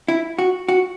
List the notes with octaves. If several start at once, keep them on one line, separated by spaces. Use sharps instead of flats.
E4
F#4
F#4